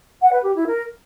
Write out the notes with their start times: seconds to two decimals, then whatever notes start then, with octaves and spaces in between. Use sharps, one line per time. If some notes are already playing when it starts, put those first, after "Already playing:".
0.21 F#5
0.32 B4
0.44 G4
0.55 E4
0.66 A#4